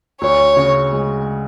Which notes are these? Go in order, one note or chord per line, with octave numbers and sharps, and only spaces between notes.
D2 C#5
C#3
G#3